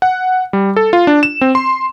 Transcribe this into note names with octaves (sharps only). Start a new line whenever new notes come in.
F#5
G3
A4
F4
D4
E7
C4
C6